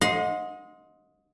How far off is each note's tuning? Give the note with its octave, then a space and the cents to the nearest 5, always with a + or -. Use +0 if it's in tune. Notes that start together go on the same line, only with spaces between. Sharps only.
D#5 +15 F#5 -40 C6 +0